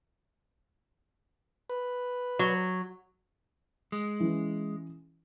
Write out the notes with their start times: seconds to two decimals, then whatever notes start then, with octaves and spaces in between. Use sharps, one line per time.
1.70 B4
2.39 F#3
3.92 G#3
4.20 E3 C#4 E4